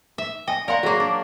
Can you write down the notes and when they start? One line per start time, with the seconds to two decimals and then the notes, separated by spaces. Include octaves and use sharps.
0.18 E5
0.48 D#5 G5 G#5
0.68 A#4 D5 F5 F#5 C6
0.83 F#3 A#3 F#4 G#4 C6
1.00 D4